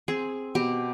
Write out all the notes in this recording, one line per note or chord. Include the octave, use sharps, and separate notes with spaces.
C4 G#4
B2 G4